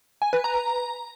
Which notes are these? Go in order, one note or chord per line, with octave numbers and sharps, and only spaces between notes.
G#5
B4
A#5